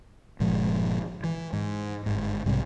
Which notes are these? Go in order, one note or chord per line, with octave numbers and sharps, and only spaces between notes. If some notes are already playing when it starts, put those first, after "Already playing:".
G1 A#2 F3 G#3
E3
G#2
G1 G#2
B1 G#2 C3 G3